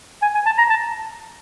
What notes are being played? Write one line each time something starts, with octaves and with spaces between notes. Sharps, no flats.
G#5
G#5
A5
A#5
A5